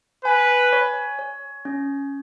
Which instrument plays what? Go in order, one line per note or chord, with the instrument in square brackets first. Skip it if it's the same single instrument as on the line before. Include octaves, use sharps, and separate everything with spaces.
[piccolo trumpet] B4 [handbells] G#5
[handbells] C#5
C#5
C#4